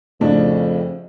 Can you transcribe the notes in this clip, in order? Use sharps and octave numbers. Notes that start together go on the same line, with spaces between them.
F2 A2 C#3 D4